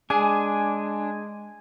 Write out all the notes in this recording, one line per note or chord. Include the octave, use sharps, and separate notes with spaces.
G#3 D4 G#4 G#5